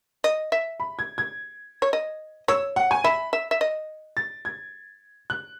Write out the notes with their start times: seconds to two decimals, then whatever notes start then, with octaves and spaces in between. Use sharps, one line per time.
0.24 D#5
0.52 E5
0.80 B5
0.99 G#6
1.18 G#6
1.82 C#5
1.93 D#5
2.48 C#5 E6
2.76 F#5
2.91 G#5
3.04 E5 B5
3.33 E5
3.51 E5
3.61 D#5
4.17 A6
4.45 G#6
5.30 F#6